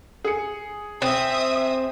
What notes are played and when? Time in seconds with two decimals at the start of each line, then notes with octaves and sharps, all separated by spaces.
0.25 G#4 C#7
1.02 C4 E5 D#6